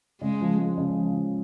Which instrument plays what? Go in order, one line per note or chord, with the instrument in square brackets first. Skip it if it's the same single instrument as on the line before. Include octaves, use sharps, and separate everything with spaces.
[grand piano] C#3 [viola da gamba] G#3
[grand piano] F3
G#3
C#3
F3
F3